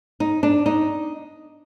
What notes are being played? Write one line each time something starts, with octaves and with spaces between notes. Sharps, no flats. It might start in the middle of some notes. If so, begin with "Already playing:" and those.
D#4
D4
D#4